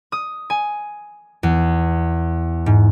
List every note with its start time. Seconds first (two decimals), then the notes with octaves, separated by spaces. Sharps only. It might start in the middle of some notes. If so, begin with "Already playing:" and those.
0.12 D#6
0.50 G#5
1.43 E2
2.66 G#2